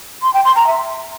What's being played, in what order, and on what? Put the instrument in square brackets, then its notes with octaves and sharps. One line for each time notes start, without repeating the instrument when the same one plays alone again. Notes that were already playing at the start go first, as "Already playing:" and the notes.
[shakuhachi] C6
G5
C6
A#5
E5